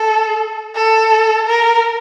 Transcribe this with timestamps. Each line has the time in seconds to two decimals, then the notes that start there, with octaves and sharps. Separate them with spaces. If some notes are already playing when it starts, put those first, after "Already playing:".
Already playing: A4
0.75 A4
1.46 A#4